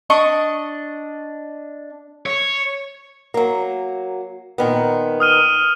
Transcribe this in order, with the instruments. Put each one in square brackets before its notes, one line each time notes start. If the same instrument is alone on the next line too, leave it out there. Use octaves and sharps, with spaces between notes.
[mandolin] D4 D#5 C#6
[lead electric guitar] C#5
[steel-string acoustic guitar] F#3 A#3
A#2 D#3 B3
[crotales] D#6 F6 D#7